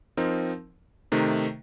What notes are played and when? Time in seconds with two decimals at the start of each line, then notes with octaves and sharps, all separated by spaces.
0.17 F3 C4 D#4 A#4
1.12 C3 D#3 A3 D#4